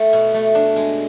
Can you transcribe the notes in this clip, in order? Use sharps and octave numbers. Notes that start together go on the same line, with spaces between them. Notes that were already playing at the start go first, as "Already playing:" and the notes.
Already playing: A3
B2
A3
D4
G#3